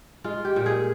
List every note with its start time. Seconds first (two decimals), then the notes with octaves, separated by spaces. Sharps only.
0.24 G#3 F4
0.45 G4
0.56 A#2
0.66 G#4